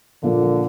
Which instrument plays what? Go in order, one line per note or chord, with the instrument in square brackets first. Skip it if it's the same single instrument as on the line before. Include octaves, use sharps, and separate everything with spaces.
[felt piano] A#2 F3 A#3 [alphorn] D3